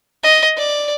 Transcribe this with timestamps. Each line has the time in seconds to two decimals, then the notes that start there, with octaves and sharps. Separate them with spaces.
0.23 D#5
0.57 D5